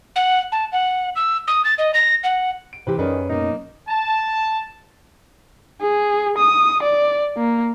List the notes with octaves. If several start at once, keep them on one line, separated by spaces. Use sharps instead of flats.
F#5
A5
F#5
E6
D#6
A6
D#5
A#6
F#5
D7
C3 E3 C4 G4 B4
F#2 D#3 C#4 G#4 A#4 B4 D5
B2 A#3 D#4
A5
G#4
D#6
D5
A#3